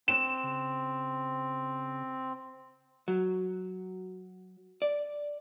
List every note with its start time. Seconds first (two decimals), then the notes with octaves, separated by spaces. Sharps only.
0.08 C4 E7
0.43 C#3
3.08 F#3
4.82 D5